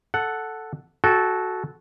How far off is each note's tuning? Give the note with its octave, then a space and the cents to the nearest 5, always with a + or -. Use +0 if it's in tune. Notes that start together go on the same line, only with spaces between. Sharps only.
A4 +0 F#5 +0
F#4 +0 A4 -15 G5 +25